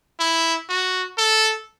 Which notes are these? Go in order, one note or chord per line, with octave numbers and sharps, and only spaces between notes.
E4
F#4
A4